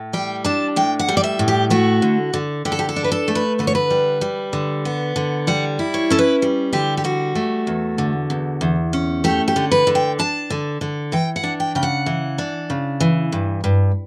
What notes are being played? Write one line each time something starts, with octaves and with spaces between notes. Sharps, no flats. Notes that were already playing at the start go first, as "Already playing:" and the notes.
Already playing: A2
G3 G5
D4 A5
A2 G5
F#5
G3
D5
E5
A2
G4
A3 F#4
D3
D3
D3 G4
A4
G4
A4
D4
B4
A4
A3
B4
D3 B4
C#5
B4
G3
G3
D3
B3
D3
G3 F#5
E4
C#5
C#4 A4
B4
G3
D3 G4
G4
G3 F#4
A3
E2
D3
E2
E2
C#4
A3 G4
G4
D3
B4
D3
G5
D4 A5
D3
D3
E3 G5
F#5
D4
G5
C#3 G5
F#5
E3
D4
C#3
E3
G2
G2